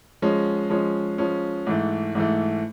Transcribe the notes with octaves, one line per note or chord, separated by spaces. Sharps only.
F3 G#3 C#4
F3 G#3 C#4
F3 G#3 C#4
G#2 E3 A3
G#2 E3 A3